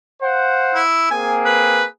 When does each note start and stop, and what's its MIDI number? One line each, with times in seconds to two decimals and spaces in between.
0.22 0.82 72
0.22 0.82 77
0.22 0.82 78
0.75 1.09 64
1.11 1.84 58
1.11 1.84 60
1.11 1.84 68
1.11 1.37 80
1.45 1.84 71